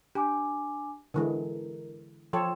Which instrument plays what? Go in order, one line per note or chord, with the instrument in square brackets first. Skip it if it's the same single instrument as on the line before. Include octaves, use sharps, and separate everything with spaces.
[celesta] D4 G#5 D6 [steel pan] G4
[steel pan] D3 E3 G#3 [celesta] A#4
[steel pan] F3 A4 C#5 [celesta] G5 C6